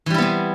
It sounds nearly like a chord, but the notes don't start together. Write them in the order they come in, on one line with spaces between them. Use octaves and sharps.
E3 G3 E4 B3 C4